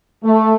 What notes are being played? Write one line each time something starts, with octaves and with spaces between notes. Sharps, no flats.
A3